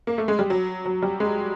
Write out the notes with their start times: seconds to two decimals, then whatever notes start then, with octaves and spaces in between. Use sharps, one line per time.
0.07 A#3
0.18 A3
0.28 G#3
0.39 G3
0.50 F#3
0.85 F#3
1.03 G3
1.20 G#3